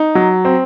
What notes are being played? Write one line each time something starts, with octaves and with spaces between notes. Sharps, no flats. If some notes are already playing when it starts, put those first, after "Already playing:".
Already playing: D#4
F#3
C4